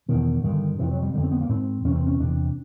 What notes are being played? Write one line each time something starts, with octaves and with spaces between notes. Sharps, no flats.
E2 B2 D#3
G2 D3 D#3
F2 C3 E3
F#3
G3
F2 D3 G3
C4
B3
A#3
G#2 C4
E2 C3 C#4
C4
C#4
E2 C3 D4